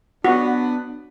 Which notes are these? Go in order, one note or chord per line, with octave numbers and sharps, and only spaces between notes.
B3 D4 F#4